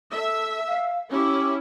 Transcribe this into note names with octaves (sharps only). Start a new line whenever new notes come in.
A4 E5
F5
C#4 E4 G4